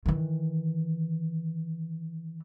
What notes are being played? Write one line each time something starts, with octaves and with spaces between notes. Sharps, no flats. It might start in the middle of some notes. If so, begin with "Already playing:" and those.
D#3 E3